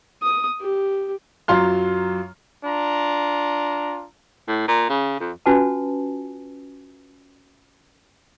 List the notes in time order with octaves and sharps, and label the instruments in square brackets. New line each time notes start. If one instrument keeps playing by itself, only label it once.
[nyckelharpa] D#6
G4
[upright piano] F#2 F#3 F4 C6 F6
[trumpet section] D4 F4 A#5
[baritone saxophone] A2
A#2
C#3
F2
[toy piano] C#4 F4 F#4 B4 G#5 A5